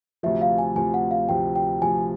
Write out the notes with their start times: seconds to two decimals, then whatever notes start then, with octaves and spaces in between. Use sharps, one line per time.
0.23 D2 C3 F3 E5
0.42 F5
0.58 G#5
0.76 D2 C3 F3 G#5
0.94 F#5
1.11 F5
1.29 D2 C3 F3 G5
1.56 G5
1.82 D2 C3 F3 G#5